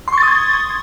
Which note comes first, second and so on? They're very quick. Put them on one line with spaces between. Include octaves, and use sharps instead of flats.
C6 C#6 A6 D#6 G#6